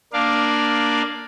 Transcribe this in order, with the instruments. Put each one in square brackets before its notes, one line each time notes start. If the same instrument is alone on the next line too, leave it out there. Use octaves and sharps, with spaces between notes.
[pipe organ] A#3 D4 D5 F5